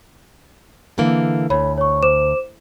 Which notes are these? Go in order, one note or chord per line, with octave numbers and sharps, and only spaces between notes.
D3 E3 A#3
D2 C#5 B5
C#5 C#6
C5 D6 E7